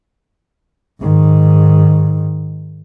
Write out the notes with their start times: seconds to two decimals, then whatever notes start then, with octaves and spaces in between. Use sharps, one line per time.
1.01 G#2 D#3